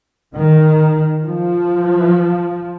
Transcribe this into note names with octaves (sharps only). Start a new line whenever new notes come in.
D#3
F3